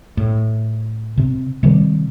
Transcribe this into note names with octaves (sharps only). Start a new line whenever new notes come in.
A2
C3 C4
C3 D#3 G3 C4